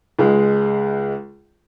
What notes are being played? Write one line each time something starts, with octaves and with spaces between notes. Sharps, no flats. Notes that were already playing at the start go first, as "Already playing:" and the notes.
C#2 G#3